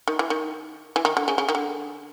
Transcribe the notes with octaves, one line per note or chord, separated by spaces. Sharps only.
D#3
E3
D#3
E3
D#3
D3
C#3
C#3
D#3
D3